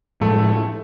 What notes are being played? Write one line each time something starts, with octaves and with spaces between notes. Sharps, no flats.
A2 F3 G#3 A3